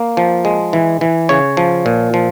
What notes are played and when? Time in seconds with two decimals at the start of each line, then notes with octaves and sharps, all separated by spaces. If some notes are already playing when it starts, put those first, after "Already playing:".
Already playing: A#3
0.17 F3
0.45 G#3
0.73 E3
1.01 E3
1.29 C#3 C#5
1.57 F3
1.86 A#2
2.14 F3